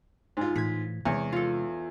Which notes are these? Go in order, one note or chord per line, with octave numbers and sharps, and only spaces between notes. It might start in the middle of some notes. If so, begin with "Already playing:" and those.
G#2 F4
A2 E3 G#6 B6
E2 C3 G#3 C#5
F4 A4